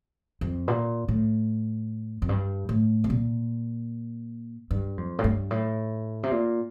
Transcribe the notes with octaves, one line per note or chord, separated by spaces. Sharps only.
F2
A#2
A2
F2
G2
A2
C3
A#2
G2
F2
A2
G2
A2
C3
A#2